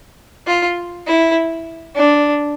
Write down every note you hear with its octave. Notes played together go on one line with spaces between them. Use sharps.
F4
E4
D4